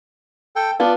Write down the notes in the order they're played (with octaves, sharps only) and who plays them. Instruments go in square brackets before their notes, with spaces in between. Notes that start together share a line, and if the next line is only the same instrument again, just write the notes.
[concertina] A4 G5
[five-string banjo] B3 F4 [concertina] D4